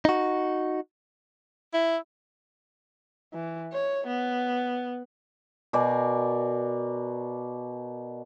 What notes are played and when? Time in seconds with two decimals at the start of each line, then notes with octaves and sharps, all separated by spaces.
0.05 D#4 F#4
1.74 E4
3.34 E3
3.73 C#5
4.07 B3
5.73 B2 A#4 D5 G#5